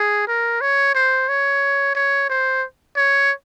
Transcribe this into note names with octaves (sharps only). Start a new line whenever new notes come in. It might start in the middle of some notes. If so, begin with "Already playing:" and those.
Already playing: G#4
A#4
C#5
C5
C#5
C#5
C5
C#5